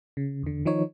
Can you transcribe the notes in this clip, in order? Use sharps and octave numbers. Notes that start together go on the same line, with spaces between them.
C#3
E2 D3
D#3 F3 D#4 C#5